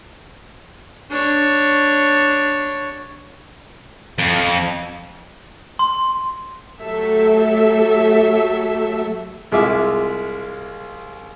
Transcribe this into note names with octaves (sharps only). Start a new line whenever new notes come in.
D4 C#5
F2
C6
F#3 A3 G4 A4 E5
C2 G#3 F4 E5 D6